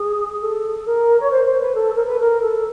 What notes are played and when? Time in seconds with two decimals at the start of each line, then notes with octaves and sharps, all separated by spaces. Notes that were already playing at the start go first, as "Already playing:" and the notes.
Already playing: G#4
0.41 A4
0.85 A#4
1.20 C#5
1.30 C5
1.45 C5
1.60 B4
1.74 A4
1.95 A#4
2.05 B4
2.19 A#4
2.41 A4